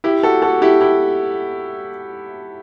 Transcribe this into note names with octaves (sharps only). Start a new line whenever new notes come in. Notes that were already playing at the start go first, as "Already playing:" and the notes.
E4 G4
F#4 A4
F#4 A4
E4 G4
E4 G4